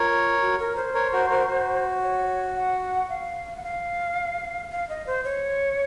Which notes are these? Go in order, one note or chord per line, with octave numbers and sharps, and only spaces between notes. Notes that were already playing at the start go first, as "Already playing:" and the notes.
Already playing: F4 A#4 C#5
F#4
A#4
C5
A#4 C#5
F#4 A#4
F#4 A#4
F#4
C#5
F#5
F5
F#5
F5
F5
D#5
C5
C#5